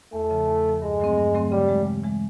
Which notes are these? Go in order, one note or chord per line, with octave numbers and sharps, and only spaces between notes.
E2 A3
C#3 F3
E2
C#3 F3
G2 G#3
D3 F#3 A3 C4
G2
D3 F#3 A3 C4
C#3 G3
E3 G#3
C#3
E3 G#3